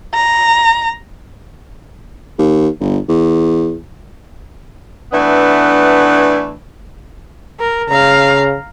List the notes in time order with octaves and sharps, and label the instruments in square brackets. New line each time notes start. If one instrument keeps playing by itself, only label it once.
[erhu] A#5
[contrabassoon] D#2
G1
E2
[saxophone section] E3 A3 B3 D4
[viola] A#4
[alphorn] C#3 [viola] F5 A#5